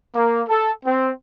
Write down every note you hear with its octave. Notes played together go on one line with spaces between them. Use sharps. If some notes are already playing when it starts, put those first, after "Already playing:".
A#3
A4
C4